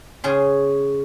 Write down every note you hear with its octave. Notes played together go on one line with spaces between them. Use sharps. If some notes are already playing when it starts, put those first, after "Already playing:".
C#3 G#4 C6